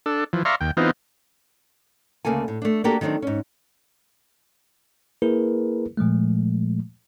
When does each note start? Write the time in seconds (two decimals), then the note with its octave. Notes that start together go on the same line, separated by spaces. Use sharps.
0.06 D4 A4
0.33 E3 F3
0.45 D5 E5 F5 A#5 C6 C#6
0.61 D#2 G5
0.77 E3 B3 C4 D#4 F4
2.25 D2 C#3 A#3 A4 G#5
2.48 A2
2.62 A3 D4
2.84 A#3 D4 F#4 G4 A4 A#4
3.01 D#3 F#3 G3 C4 D4
3.22 G#2 C#4
5.22 A#3 E4 G#4 A#4 B4
5.97 A#2 F3 G#3 A3